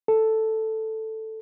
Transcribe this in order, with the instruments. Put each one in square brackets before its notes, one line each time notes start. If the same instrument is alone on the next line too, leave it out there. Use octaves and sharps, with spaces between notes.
[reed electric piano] A4